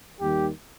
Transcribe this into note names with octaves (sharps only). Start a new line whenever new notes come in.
D#2 D#3 G3 G4